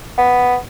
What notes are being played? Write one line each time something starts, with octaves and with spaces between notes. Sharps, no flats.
B3